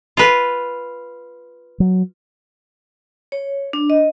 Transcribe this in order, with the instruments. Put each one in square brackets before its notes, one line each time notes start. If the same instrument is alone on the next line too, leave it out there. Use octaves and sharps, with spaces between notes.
[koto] F4 B4
[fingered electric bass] F#3
[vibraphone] C#5
D4
D#5